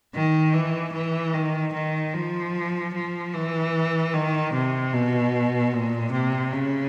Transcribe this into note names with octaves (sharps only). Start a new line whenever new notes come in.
D#3
E3
E3
D#3
D#3
F3
F3
E3
D#3
C3
B2
A#2
C3
C#3